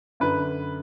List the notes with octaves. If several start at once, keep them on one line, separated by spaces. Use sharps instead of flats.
F#2 D3 B4